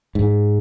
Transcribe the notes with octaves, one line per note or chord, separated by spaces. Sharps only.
G#2